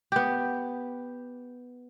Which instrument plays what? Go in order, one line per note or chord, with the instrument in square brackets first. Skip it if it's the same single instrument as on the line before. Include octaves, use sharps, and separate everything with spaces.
[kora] B3 G4